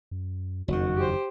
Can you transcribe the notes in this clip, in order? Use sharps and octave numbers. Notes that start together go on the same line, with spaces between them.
F#2
F#1 F2 D#3 F#4
G4 C5